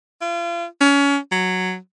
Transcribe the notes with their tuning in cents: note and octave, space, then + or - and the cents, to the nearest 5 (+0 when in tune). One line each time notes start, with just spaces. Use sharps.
F4 -35
C#4 +25
F#3 +0